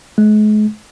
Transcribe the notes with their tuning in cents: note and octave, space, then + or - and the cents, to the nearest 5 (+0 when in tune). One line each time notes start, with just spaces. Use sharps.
G#3 +40